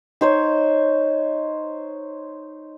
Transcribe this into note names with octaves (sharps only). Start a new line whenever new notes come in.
D#4 C5 C#5